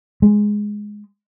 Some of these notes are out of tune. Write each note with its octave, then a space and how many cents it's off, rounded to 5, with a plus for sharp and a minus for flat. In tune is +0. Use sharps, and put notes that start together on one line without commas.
G#3 +0